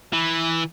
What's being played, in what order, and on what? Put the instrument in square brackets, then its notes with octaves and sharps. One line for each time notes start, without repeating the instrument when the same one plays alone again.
[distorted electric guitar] E3